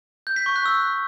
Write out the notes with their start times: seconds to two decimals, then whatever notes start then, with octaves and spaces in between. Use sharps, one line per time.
0.27 G6
0.36 B6
0.46 C#6
0.56 F#6
0.66 E6